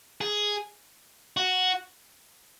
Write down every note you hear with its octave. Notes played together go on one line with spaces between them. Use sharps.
G#4
F#4